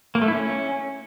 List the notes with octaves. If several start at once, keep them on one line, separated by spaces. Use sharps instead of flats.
A#3
A3
E4
C#4